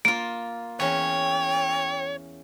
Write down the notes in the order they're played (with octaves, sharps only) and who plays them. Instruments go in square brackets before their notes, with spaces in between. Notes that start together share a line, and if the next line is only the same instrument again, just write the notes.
[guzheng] A#3 F4 [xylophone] D7
[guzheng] E2 C#4 [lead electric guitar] C#5 [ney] G5